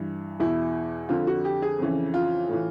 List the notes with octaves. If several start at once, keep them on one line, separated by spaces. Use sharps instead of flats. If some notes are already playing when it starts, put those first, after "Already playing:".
Already playing: G2 E3
E2 B2 E4
F2 D3 F4
F#4
G4
G#4
F2 C#3 E3
F4
A2 E3